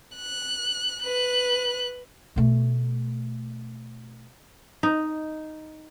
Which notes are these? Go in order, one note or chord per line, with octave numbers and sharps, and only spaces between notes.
F#6
B4 F#6
B2 A3
D#4